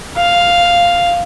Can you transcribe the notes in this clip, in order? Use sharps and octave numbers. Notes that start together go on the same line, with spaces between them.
F5